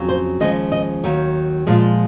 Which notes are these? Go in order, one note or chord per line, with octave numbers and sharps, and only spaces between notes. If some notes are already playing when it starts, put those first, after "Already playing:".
Already playing: F2 C#3 F#3
C5
D#2 C#3 F3 G#3 D#5
D#5
D#2 D#3 F#3
A#2 F3 G#3